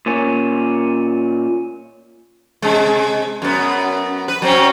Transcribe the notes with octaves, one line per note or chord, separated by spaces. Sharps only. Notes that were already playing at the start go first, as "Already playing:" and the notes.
A#2 C#4
C3 G#3
F#2 B3
B4
F#3 C4 C#4